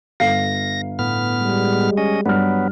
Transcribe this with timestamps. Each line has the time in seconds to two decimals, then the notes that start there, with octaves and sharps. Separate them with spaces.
0.20 G1 F5 A#6 C7
0.99 A2 B3 F6
1.40 G3 G#3
1.97 C#4 D#5
2.26 G2 F#3 B3 F6